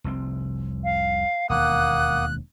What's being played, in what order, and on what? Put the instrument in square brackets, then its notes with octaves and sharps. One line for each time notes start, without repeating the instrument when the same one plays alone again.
[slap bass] F1 C2 C4
[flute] F5
[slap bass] E1 D#2 [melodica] A#3 F#5 D#6 [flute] F#6